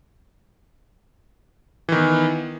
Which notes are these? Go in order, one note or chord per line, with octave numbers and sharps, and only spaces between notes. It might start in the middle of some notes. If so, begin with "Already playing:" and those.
D#3 E3 B3